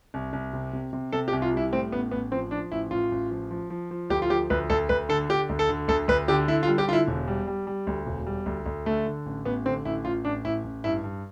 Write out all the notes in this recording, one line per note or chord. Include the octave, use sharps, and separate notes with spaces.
C2
C2
C3
C3
C3
C3 A4
G4
C2
F4
G3 E4
A2 C4
A1 B3
A1 B3
F3 C4
F3 D4
A1 E4
A1 F4
A1
F3
F3
F3
F3
D2 G4
F4
F3 G4
D2 B4
D2 A4
D2 B4
D3 A4
D3 G4
D2
A4
D3
D2 A4
D2 B4
D3 G4
D3 E4
F4
G3
G4
D3 F4
E4
E1
G3
G3
G3
D2
E1
G3
D2
D2
D3 A3
D3
A1
A1 B3
D3 C4
A1 E4
A1 F4
A1 D4
A1 E4
A1
G2 E4
G2